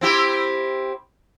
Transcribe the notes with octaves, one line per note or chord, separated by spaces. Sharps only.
C4 E4 G4